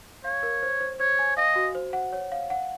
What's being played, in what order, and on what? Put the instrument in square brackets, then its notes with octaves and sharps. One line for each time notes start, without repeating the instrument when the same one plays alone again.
[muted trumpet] C#5 [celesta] F5
[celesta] A#4
C5
C5
[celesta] C5 [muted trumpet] C#5
[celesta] G#5
[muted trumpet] D#5 [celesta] F5
[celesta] F#4
C5
F#5
C#5
F5
F#5